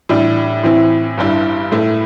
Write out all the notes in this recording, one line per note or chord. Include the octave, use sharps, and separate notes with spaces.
A2 E3 G3 D4
A2 E3 C4 E4
G1 G2 G3 E4
A2 A3 E4